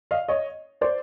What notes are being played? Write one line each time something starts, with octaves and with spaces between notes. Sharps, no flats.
D#5 F5
C#5 D#5
C5 D5